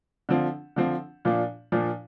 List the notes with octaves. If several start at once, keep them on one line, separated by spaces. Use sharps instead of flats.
D3 F3 C4
D3 F3 C4
A#2 F3 D4
A#2 F3 D4